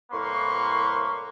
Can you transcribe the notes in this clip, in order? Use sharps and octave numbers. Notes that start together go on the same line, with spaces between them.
C2 A2 A#3 B4 C6 C#6